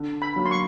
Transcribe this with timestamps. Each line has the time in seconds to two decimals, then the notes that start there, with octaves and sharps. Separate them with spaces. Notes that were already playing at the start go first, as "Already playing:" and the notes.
Already playing: D3
0.22 B5
0.36 F#3 A#3
0.46 C6
0.51 C#6